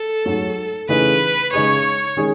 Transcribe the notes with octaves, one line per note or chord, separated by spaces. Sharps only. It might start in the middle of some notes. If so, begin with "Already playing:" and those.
Already playing: A4
G#2 F#3 A3
C#3 E3 A3 D#4 G#4 B4
C#3 G#3 D#4 G#4 C#5
D#3 G#3 C#4 G#4